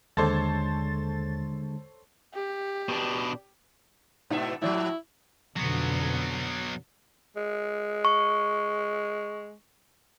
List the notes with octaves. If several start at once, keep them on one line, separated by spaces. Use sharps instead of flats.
D#2 D3 G#3 A4 C5 C#5 A6
G4
B2 D4
G#2 B2 D#4 E4 E5 F#5
A2 D#3 F3 A3 E4 F#4 D5
F2 B2 D3 F#3 B3
G#3
C#6